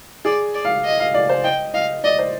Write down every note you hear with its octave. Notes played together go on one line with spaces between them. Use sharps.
G#4 D5
D5
F5
D#5
F5
D5
C5
D#5 G5
D#5 F5
D5 D#5
C5